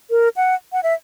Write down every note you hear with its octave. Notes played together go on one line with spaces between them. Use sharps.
A#4
F#5
F#5
E5